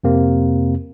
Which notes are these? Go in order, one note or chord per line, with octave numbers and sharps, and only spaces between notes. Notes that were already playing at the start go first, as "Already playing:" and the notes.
F2 C3 A#3 C4